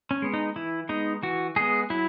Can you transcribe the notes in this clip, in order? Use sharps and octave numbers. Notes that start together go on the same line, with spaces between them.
C#4
G#3 B3
D#4
E3 E4
G#3 B3 D#4
E3 F#4
G#3 B3 G#4
F#3 E4